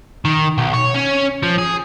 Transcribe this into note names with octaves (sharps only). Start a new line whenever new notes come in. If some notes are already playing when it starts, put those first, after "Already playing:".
D#3
B1
C#5
C#4
F3
G#4